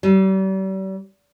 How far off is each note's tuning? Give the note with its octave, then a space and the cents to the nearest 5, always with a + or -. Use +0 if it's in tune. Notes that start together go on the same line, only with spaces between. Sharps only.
G3 -40